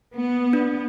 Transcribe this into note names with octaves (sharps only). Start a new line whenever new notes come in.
B3
D4